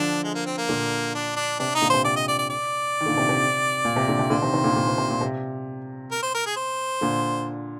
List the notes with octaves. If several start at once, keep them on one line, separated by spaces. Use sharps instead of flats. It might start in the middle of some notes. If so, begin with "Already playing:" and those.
Already playing: D3 F3 D4
G#3
A#3
C4
A#3
A#2 D3
D4
D4
C3 D4
D#4
A#2 D3
C3 C5
C3 D5
D#5
D5
D5
D5
D#3
A#2 D3
C3
C3
A#2
C3
A#2 D3
C3
A#2 D3 C5
C3 D#3
C3 D#3
A#2 D3
A#2 D3
C3
C3
A#2
C3
A#4
C5
A#4
G#4
C5
A#2 D3